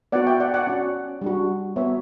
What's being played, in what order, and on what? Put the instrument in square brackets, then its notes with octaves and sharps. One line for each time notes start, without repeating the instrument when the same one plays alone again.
[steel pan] B3 F#4 D5 F#5
E5 G5
D5 F#5
D5 F#5
C#4 F#4
G3 D4 F#4
B3 C#5 E5
F#4